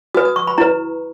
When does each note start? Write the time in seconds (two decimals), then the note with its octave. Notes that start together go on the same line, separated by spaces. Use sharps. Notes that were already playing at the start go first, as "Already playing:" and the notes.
0.14 F#4 B4 D#6
0.25 D#6
0.36 C#6
0.47 B5
0.58 E4 B4 A#5